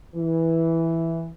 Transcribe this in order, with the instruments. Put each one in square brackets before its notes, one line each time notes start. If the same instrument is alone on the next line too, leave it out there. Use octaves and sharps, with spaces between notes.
[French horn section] E3